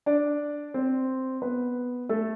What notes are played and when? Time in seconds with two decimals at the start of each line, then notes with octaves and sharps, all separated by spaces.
0.06 D4 D5
0.74 C4 C5
1.42 B3 B4
2.09 A3 A4